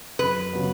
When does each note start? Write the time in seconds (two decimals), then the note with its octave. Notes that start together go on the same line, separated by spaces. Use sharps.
0.19 F#2 B4
0.53 C#3 F#3 B3